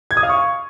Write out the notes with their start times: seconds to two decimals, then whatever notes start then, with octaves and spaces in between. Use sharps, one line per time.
0.11 G#6
0.17 D#6
0.23 F5
0.29 C#6